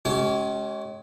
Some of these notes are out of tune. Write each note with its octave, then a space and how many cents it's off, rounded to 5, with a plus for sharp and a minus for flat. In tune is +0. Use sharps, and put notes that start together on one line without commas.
G#3 +30 C#4 +0 G4 -45